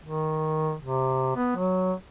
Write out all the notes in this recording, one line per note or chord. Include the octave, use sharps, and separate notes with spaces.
D#3
C3
B3
F#3